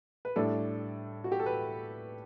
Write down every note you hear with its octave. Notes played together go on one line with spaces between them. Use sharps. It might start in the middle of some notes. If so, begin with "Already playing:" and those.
B4
A2 G3 D4 A4
F#4
G4
A4
B4